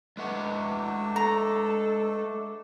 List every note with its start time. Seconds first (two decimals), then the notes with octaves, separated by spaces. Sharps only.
0.17 G#3 A3 D4 B4 F#5
1.16 A4 A#5